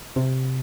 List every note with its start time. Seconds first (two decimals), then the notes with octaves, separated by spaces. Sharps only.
0.16 C3